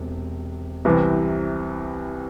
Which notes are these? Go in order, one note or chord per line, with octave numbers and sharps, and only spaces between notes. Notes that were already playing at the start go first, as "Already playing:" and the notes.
Already playing: E1 C3
C2 C3 E3